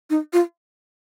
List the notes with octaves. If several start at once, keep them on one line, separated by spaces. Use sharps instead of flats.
D#4
F4